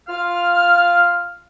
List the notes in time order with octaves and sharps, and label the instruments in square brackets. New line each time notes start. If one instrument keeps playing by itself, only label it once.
[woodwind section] F4 F5 F6